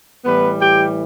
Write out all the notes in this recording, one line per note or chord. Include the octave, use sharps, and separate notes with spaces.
A2 E3 G3 B3 B4
G4 G5